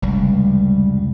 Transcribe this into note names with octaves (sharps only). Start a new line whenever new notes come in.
F1 C#2 G3